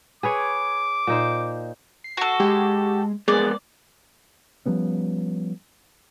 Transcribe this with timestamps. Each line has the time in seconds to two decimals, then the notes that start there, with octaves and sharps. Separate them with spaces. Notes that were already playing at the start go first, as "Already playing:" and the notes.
0.23 G#4 B4 C#5 D6
1.07 A#2 D#4 C5
2.04 C7
2.17 F#4 A4
2.40 G#3 G4
3.28 G#3 B3 G#4 A#4 D5
4.66 F3 G3 B3 C#4